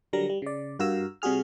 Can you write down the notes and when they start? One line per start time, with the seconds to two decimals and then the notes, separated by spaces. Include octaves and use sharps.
0.13 D3 F#3 G3 A#4 A#6
0.29 G3
0.42 C#3 D5
0.79 G2 F#4 A#4 F5 A#5 E6
1.22 C3 G3 F#4 G#4 F6